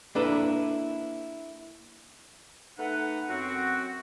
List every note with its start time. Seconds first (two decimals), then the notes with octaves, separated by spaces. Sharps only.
0.15 A#3 D4 E4 A4 B4
2.78 A3 B3 D#4 B4 F#5
3.28 F#2 C4 F#4